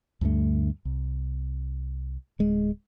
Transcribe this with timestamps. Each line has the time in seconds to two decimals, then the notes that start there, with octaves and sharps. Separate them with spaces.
0.21 D2 G2 D3 A3
0.85 C2
2.39 D1 G#3